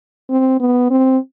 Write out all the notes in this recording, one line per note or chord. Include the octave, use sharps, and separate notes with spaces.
C4
B3
C4